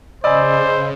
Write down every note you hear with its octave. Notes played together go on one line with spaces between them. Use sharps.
C#3 C5 D5 D#5 G#5 B5 E6